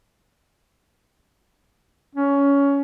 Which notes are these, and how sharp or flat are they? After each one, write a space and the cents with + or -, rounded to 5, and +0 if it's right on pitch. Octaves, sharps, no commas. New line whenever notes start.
C#4 +15